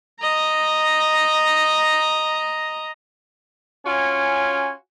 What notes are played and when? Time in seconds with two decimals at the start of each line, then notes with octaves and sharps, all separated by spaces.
0.20 D#5 A#5
3.85 C#4 F4 F#4 C#5 G#5